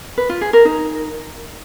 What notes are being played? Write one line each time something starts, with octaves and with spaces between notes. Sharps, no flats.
B4
F4
G#4
A#4
D#4